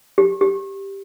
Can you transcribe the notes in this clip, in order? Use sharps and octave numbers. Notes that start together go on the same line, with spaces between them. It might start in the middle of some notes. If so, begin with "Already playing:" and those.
G4
G4